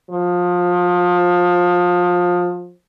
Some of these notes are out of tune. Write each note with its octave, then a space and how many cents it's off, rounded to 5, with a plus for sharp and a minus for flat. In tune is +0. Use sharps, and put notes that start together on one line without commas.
F3 +25